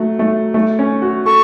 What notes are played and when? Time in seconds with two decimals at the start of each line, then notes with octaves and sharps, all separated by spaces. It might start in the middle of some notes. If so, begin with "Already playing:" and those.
Already playing: F#3 A3
0.19 A3
0.54 A3
0.79 C#4
1.02 F#4
1.26 A4 C#6